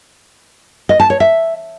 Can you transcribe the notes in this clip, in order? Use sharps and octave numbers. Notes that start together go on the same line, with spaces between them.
D#5
A5
C#5
E5